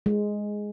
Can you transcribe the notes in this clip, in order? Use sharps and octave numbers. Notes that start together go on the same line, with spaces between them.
G#3